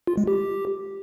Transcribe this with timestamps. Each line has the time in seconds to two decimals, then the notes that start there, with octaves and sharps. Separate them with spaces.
0.07 F4
0.17 G#3
0.27 G4